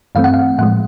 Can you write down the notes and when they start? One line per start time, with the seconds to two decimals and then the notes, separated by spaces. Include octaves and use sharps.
0.15 G2 E3 A3 C4 F5
0.24 F#5
0.34 F5
0.58 A2 F3 G#3 F#5